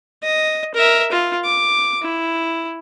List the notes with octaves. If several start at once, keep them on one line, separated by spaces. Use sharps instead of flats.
D#5
A#4 E5
F4
D6
E4